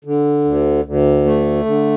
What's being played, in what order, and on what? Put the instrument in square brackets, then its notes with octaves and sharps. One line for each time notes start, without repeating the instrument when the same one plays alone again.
[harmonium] D3
D2
D2
A3
D3